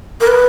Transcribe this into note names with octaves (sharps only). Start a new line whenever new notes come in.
A#4
B4